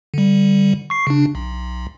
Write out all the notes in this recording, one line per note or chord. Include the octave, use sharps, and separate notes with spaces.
D3 G3
C#6 C7
C#3 D4
B1